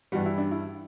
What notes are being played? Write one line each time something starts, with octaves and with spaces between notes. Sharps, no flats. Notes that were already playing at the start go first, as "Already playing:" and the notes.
G2 E3 G3 F#4
E4
D4
E4